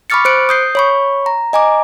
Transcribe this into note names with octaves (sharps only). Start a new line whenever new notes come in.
B5 C#6 D6 F6 A6 C#7
C5 F#6 C#7 D7
D#6 G6 C7
C#5 B5 C#6
A#5
D#5 G#5 A#5 D6